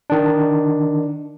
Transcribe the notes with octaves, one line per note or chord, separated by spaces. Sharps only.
D#3 D4